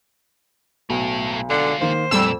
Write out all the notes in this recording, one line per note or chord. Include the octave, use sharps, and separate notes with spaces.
B1 A2 A3
D3 G#3 F4
D#3 A#3 C5
F2 A#2 G3 A3 E6